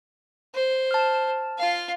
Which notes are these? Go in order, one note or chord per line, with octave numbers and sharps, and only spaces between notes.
C5
A5 F6
F4 F5